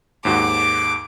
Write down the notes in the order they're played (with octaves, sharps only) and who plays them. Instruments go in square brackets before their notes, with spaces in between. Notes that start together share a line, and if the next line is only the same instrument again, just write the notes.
[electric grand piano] D#2 G#2 F#4 [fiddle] D6